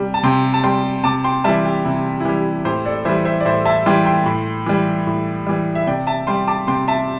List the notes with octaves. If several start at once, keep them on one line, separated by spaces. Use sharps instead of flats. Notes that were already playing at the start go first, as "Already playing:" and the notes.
Already playing: C3 G3
A5
C3 G5 C6
A5
G3 G5 C6
C3 A5 D6
G5 C6
E3 G3 E5 A5
G4
C3 E4
E4
E3 G3 G4
A2 G4 C5
A4 D5
E3 G3 C5 E5
C5 E5
D5
A2 C5 E5
E5 A5
E3 G3 G5 C6
G5 C6
A2
E3 G3
A2
E3 G3
E5
C3 D5 G5
E5 A5
G3 G5 C6
A5 D6
C3 G5 C6
E5 A5